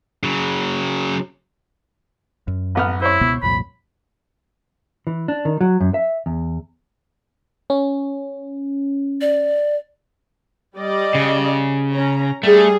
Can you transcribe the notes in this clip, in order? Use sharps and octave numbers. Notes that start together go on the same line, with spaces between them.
C#3 F#3
F#2
A1 B3 F6
E4 C5 C#5
C#2 B2 B3
C2 F2 A#2 B5
E3
D4
D#3
F#3
F#2
E5
E2
C#4
D5
G3 D5 D#5
C#3
C#4 A#5
G3 A3 G#4